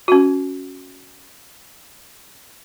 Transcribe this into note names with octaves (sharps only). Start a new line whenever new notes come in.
C#4 F#4